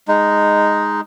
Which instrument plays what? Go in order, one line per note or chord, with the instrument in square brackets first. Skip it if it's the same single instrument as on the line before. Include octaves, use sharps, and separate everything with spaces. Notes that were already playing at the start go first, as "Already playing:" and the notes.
[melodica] G#3 D#4